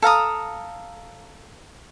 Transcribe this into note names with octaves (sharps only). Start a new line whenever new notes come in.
A4 F5 A#5 D#6